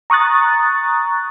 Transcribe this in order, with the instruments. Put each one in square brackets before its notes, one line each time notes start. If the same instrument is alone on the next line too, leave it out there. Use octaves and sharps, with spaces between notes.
[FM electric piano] A#5 C#6 D#6 F#6 A6